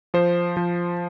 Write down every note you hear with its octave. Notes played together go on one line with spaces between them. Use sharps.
F3 C5
F3